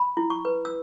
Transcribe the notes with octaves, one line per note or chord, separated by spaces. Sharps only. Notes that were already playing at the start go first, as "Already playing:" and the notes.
Already playing: B5
E4
C#6
B4
E6